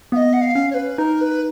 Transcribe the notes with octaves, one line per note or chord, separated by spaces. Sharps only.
B3 D#5 F5
F#5
F5
C#4
C#5
B4
D#4 A#4
B4